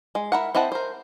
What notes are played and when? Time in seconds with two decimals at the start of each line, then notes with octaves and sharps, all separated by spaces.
0.15 G#3
0.32 E4 A#4 F#5
0.55 C4 E4 D#5 F#5 A5
0.72 A#4 C5